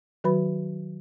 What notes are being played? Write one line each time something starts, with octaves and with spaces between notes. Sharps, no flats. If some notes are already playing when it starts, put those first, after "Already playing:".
D#3 F#3 F#4 B4 B5